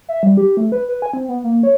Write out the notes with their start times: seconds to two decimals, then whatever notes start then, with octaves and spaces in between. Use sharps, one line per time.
0.09 E5
0.23 G3
0.37 G4
0.57 A3
0.72 B4
0.89 B4
1.02 G#5
1.13 C4
1.28 B3
1.44 A#3
1.63 C#5